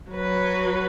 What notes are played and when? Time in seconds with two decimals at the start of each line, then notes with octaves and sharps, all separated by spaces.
0.11 F#3 B4